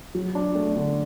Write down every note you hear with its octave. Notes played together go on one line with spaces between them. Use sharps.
F#3
D4
A3
D3